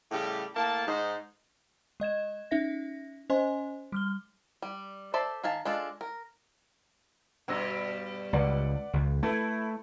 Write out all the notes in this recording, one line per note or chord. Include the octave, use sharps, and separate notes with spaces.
A2 C#3 G3 G4
A2 A#3 A5
G#2 D#4 C5
G#3 D#5 G#6 E7
C#4 D#4 E5 A#6
C#4 C5 D#5 G#5 C6
G3 F6 G7
G3
A4 C5 D5 E5
D#3 F5 G#5 A5
G#3 D4 F4 A4
A#4
G2 B2 G3 G5 E6 A#6
C#2 B4 D5 F#5
C#2
A3 E4 A4 B4